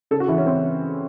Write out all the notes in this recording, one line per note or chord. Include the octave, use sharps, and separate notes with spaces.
C#3 A4
F#4
E3 E4
C#4
C#3 C4